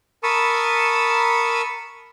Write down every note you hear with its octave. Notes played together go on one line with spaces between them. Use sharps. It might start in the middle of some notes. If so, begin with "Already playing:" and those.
A#4 A5 B5 C#6 D#6 E6